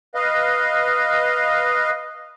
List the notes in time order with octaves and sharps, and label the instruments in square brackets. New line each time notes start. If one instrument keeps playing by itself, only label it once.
[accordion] B4 D#5 F5